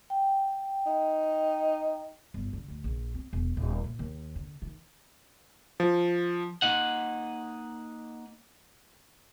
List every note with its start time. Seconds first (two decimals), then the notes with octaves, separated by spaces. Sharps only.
0.10 G5
0.87 D#4
2.34 G1
2.53 D3
2.68 D2
2.84 A#1
3.14 C4
3.33 E1
3.57 D#1
3.84 A#2
3.99 D#2
4.36 D3
4.62 D#3
5.80 F3
6.62 A#3 D#4 D#5 F#5